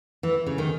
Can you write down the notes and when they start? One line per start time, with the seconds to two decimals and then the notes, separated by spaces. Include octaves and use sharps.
0.23 E3
0.46 C#3
0.58 D#3